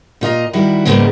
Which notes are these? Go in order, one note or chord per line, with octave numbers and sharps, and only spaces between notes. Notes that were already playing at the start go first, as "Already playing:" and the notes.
A#2 F4 D#5 A#5
D#3 G3 E4 F#4
G#2 C#3 G3 G#3 A#3 B3